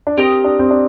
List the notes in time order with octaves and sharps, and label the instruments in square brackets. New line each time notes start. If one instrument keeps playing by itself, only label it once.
[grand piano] D4
[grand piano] C4 [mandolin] G4 A#4 D#5
[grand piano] D4
C4
D4